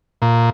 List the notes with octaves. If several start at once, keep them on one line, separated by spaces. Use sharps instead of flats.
A#2